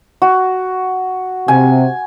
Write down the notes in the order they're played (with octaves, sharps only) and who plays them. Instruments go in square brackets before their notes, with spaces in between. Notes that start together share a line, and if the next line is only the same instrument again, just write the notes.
[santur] F#4
[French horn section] C3 [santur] G#5